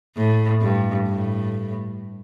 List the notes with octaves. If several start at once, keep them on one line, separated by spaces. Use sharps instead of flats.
A2
G2
A2